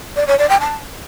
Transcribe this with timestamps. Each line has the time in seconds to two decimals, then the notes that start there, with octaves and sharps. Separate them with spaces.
0.16 D5
0.27 C#5
0.38 D5
0.49 G5
0.60 A5